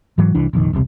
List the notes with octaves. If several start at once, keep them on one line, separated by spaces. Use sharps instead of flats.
G#2 E3 F#3
C2 E3 D4
F1 A#1 D#3
E1 C2 C3